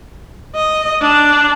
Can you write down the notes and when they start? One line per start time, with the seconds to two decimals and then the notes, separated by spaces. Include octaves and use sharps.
0.55 D#5
1.01 D4